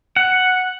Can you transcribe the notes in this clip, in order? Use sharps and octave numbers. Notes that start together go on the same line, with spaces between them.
F#5